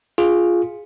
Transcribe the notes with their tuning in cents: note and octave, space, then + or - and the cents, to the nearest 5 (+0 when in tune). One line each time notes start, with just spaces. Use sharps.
F4 +0 G#4 +0